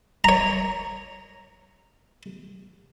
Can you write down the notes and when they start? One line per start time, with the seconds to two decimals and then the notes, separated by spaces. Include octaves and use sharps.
0.24 C#5 A#5